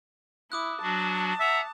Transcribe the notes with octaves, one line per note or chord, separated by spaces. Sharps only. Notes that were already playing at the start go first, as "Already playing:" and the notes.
E4 D6 D#6 F#6
F#3 D4 F#4 A5
E5 F#5 A#5